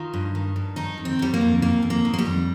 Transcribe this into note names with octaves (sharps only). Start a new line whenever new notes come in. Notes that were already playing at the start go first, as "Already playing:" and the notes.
Already playing: D#3 F4
G2
D#3
G2
D#3 D#4
F2
C4
D#3 G3
A#3
F2
D#3 A#3
F2
A#3
D#3
A#3
G3
F2